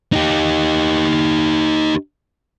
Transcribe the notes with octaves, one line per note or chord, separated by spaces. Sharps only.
D#4 G4